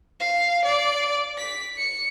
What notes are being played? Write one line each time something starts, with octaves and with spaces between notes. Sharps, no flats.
F5
D5
B6
C#7